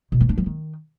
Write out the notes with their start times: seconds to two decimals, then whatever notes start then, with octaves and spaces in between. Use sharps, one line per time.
0.12 B2
0.21 E3
0.29 D4
0.38 F3
0.46 D#3